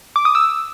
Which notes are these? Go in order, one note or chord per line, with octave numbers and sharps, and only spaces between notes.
D6
D#6
E6